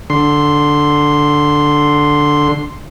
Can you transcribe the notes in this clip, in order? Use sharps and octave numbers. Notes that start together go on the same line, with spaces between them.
D3 C6